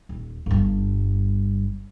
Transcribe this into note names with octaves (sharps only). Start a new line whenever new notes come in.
D#1
G1 G2